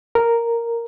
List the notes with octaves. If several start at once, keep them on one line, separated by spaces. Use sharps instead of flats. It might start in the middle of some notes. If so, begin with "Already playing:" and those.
A#4